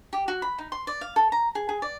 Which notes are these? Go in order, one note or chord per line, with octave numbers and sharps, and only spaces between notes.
G4
F#4
B5
D#4
C6
D5
F5
A4
A#5
G#4
G#4
D5